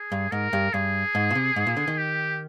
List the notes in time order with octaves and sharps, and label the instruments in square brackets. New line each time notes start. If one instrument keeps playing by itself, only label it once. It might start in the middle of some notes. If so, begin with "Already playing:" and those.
Already playing: [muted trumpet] G#4
[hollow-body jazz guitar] G2
[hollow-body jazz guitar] G#2 [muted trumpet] A#4
[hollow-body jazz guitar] G2
[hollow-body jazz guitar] G2 [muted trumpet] G#4
[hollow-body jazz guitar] G#2
A#2
C3
G#2
A#2
D3
D#3
[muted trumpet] G4